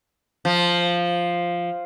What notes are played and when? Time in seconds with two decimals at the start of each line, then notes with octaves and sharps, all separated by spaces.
0.45 F3